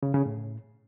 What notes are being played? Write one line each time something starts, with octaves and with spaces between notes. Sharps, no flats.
C#3
C#3
A2